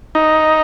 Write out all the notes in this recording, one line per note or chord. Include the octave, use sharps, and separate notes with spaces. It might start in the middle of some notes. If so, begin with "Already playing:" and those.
D#4